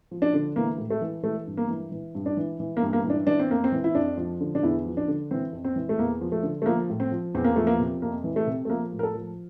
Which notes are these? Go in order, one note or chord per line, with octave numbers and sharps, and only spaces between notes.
F3
D4
D3
E3 A#3
A2
A3
E3
E3 A3
G2
A#3
E3
E3
G2
D4
E3
E3
A#3
G2
A#3
E3
D4
E3 D4
C4
F2 A#3
C4
E3
E4
F2 D4
F3
D3
D4
E2 E4
F3
D4
D3
E3 C4
F2
C4
E3
A3
E2 A#3
F3
A3
D3
A3
F3 A#3
A2
C4
F3
E2 C4
A#3
F3 A3
A#3
C3
F2 A#3
E3
A3
C3
A3
F3 A#3
A2
A#4
A4
F3